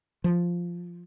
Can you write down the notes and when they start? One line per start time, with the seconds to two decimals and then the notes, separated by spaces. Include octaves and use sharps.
0.24 F3